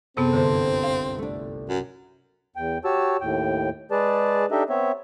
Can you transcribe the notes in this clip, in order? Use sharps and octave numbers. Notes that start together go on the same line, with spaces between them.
F#2 C3 B3 C4 A4
G1 C2 D3 A#3 F4 C5
F5
A3 D4
F#2
E2 G5
F#4 G4 C#5 A5 E6
D#2 A2 G5
G#3 G#4 B4 D5 A5
D4 D#4 G4 A4 D#5 E5
B3 C4 C#5 E5